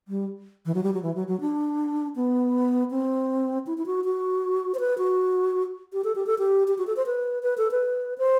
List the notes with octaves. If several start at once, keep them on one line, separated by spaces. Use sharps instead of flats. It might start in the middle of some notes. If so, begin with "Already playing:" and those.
G3
E3
F#3
G3
F#3
E3
F#3
F#3
D4
B3
C4
E4
E4
F#4
F#4
C5
B4
F#4
G4
A4
G4
A4
G4
G4
F#4
A4
C5
B4
B4
A4
B4
C5